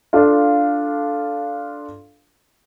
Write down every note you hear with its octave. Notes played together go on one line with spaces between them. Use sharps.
D4 F4 A4 F5